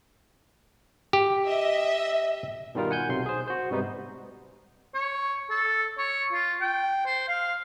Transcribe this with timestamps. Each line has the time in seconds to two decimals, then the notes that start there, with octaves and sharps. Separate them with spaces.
1.13 G4
1.47 D#5 E5
2.75 B2 D#3 G3 F4 A#4
2.91 F#5 G#5 G6
3.08 B1 C3 F#3 C6
3.26 G#4 C5
3.48 F#4 C5
3.71 G#2 C3 G3 B3 D#4
4.94 C#5
5.50 A4
5.98 C#5
6.33 F4
6.60 G5
7.05 C5
7.28 F5